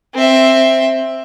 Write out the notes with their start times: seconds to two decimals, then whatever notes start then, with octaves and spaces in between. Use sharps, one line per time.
0.15 C4 E5